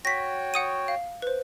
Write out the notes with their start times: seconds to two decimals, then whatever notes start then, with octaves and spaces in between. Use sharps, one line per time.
0.05 F#4 C#5 G5 A#6 B6
0.54 F#5 D#6 D#7
0.88 F5
1.22 B4 C5